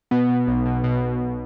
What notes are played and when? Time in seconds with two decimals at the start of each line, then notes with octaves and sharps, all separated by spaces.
0.11 B2 B3
0.29 B2
0.47 B1
0.65 B2
0.84 B2